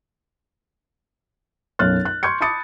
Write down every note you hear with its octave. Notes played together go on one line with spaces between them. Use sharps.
B1 F#2 C#5 F6 F#6 A6
F#6
C6 C#6 G6 G#6 C#7
A5 B5 D6 D#6 A6 C#7